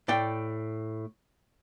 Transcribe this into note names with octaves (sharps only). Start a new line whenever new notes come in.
A2 D5 G5